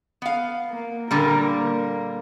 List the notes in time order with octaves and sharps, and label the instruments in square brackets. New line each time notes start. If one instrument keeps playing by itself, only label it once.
[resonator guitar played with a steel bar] B3 F5
[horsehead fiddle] A#3
[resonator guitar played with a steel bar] A#2 D3 G3 [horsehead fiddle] A#4
[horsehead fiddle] A#3